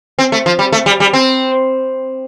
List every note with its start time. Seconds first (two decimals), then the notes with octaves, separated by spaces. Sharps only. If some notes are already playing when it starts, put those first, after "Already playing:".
0.19 C4
0.32 A3
0.46 F3
0.59 G3
0.72 A3
0.86 G3
1.00 G3
1.13 C4